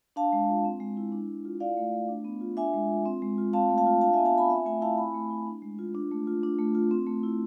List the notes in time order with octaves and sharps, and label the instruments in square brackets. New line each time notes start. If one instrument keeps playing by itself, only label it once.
[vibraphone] D4 F5 A5
G#3
F4
C4
G#3
E4
D4
G#3
F4
E4 D5 F5
A3
A3
D4
B3
F4
D4 E5 G#5
G#3
F4
C4
G#3
F4
C4 F5 A5
A3
F5 A5
F4
D4 F5 A5
E5 G#5
B3
F5 A5
F4 G#5 B5
C4 E5 G#5
A3 E5 G#5
E4 F5 A5
C4 G#5 B5
A3
E4
D4
G#3
F4
D4
A3
F4
D4
A3
F4
C4
A3
E4